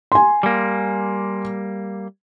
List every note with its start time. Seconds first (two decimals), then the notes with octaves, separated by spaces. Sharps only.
0.12 G#5 C6
0.43 G3 A#3